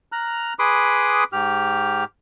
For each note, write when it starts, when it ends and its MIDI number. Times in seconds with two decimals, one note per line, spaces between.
0.12 0.54 82
0.12 0.54 89
0.12 0.54 90
0.59 1.24 68
0.59 1.24 71
0.59 1.24 83
0.59 1.24 84
0.59 1.24 86
0.59 1.24 87
1.32 2.04 44
1.32 2.04 67
1.32 2.04 89